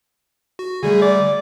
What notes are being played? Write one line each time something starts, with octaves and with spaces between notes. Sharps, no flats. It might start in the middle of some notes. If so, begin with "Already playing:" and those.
F#4
D3 G3 A3 G#4
D5